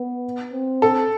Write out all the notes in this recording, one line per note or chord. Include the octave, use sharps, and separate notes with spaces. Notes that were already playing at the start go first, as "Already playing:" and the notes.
Already playing: B3
C4
A4